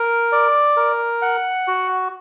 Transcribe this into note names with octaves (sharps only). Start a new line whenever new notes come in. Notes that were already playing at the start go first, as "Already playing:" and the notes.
Already playing: A#4
D5
A#4
F#5
F#4